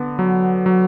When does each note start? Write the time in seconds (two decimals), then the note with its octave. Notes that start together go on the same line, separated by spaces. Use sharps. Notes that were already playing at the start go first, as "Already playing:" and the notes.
Already playing: D3 B3
0.19 F#3
0.66 F#3